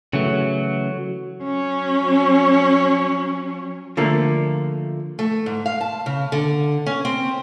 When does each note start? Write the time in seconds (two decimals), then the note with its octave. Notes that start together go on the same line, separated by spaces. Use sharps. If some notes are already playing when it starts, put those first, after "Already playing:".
0.13 C#3 E3 F#3 A3
1.44 F#3 C#4
3.97 D3 F3 A3 A#3
5.19 A3
5.46 G#2
5.66 F5
5.81 A5
6.06 C#3
6.32 D3
6.86 C#4
7.05 C4